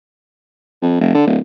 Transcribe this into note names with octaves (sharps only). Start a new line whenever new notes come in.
F2
F1
D3
D1